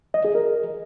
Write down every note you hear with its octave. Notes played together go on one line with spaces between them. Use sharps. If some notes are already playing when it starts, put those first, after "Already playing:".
D#5
G#4
A#4